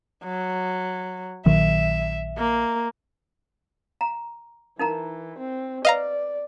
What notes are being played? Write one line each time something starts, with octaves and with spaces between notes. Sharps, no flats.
F#3
A#1 D#3 F#3 E5
A#3
A#5
E3 D#4 A#4 A#5
C4
B4 D5 D#5 F5 A#5